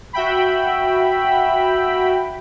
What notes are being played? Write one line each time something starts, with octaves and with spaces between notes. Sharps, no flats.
F#4 E5 G5 B5